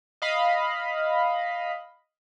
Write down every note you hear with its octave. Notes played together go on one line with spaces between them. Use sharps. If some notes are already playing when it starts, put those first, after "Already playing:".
D#5 F5 B5